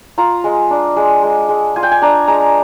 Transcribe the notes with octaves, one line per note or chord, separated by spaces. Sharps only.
F4 A#5
G#3
D4
G#3
G#3
G#3
F4 G#5
G5
G#5
D4 A#5
G#3 A#5